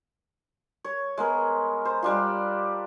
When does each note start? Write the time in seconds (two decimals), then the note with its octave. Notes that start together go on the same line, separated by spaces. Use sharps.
0.84 C#5
1.18 G#3 B3 A#4
1.85 C5
2.03 G3 D4 F4